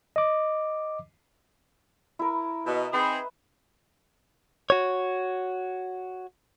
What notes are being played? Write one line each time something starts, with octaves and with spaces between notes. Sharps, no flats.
D#5 D6
E4 A#4
B2 D#5 E5
C4 D#4 G#4 B4
F#4 C#5